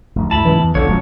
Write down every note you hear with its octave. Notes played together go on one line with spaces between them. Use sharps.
F1 D2
D2 G2 D3 E4 A5 B5
C#2 G#2 C3 E3
E2
A#1 D3 F3 C#5
E1 C#2 F#2 C3 F#3